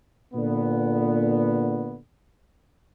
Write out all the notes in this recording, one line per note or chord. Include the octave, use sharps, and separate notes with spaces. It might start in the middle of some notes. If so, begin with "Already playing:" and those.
A#2 D3 B3